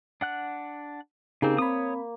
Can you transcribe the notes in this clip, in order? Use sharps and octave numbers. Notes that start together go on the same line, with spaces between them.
D4 F#5 F#6
C#3 A#3 C4 D#4 G4 G#4
C4 C#5 B5 D#6